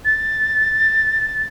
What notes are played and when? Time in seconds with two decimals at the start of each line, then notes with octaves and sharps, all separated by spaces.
0.05 A6